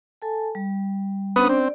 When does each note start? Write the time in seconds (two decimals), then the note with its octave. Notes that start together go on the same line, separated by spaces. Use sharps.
0.22 A4 G#5 A5
0.55 G3
1.36 B3 C#4 D4 B4 C5 D#6
1.49 C4 D5